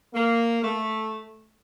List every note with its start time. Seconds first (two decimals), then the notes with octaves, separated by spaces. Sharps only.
0.13 A#3
0.63 A3